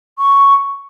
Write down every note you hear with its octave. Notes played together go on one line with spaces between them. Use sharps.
C#6